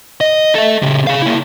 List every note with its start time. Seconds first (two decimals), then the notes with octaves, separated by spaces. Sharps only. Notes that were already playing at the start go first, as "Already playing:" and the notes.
0.21 D#5
0.55 A4 E5
0.83 C#3 G4
1.07 G#4 F5
1.22 A#3 E4